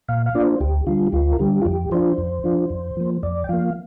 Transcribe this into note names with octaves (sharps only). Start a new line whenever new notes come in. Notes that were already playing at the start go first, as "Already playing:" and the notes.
A#2 F5
F5
A#3 D4 F4 D5
C5
D2 G4
D3 G3 F4
G4
D2 F4
A#4
D3 G3 G4
F4
F2 G4
F3 D4 F4 C5
F2
F3 D4 F4
F2
F3 A#3
F2 D5
G5
F3 A#3 F5